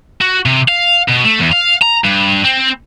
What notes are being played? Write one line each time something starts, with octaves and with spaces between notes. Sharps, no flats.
F#4
C3
F5
B2
A3
E2
F5
A#5
G2
C4